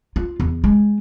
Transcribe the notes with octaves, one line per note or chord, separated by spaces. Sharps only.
F4
E2
G#3